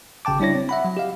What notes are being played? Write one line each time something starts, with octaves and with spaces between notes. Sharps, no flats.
G#1 C#3 G5 A5 D6
G3 D4 E4 C#5 A#6
C4
E5 F#5 B5
F#3
G4 D#5 F5